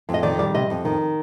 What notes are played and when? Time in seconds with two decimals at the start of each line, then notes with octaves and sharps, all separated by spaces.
0.09 F2
0.14 D#5
0.23 D#3 D5
0.39 G3 D5
0.55 C3 D#5
0.70 F2
0.85 D#3